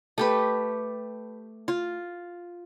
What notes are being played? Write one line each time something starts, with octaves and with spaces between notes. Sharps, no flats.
A3 G4 B4
F4